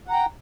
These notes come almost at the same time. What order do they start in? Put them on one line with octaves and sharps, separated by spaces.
F#5 A#5 G5